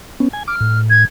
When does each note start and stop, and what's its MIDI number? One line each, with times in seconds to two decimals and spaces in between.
0.20 0.29 59
0.20 0.29 61
0.33 0.43 80
0.48 0.55 86
0.48 0.79 89
0.60 1.05 45
0.90 1.03 92